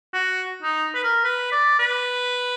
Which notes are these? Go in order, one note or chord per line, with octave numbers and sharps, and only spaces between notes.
F#4
D#4
B4
A#4
B4
D5
B4